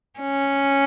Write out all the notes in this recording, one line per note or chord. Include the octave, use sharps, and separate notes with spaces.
C#4